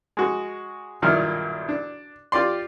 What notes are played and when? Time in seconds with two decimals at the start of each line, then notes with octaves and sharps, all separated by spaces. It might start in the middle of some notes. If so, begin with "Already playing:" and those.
0.17 G#3 F#4
1.02 B1 G2 A#2 D#3 E4 F6
1.69 D4
2.32 F4 G4 D5 C6